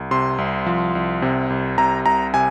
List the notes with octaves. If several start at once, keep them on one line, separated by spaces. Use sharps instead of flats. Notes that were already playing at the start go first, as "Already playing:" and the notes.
Already playing: C2
C3 C6
C2
F3
C2
C3
C2
C3 A#5
C2 A#5
C3 G#5